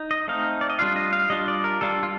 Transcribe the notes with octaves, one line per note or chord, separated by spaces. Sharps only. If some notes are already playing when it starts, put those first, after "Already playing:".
Already playing: D#4
D#5
A3 C4 D#4 F5
D5
D#5
G3 D4 F4 F5
D#5
F5
G3 D4 F4 D#5
D5
A#4
G3 D4 F4 A4
F4